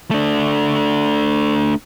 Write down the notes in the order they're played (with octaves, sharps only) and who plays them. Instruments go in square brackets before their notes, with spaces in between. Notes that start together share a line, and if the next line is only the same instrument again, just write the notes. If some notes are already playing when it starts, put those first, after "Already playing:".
[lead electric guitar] A3 D4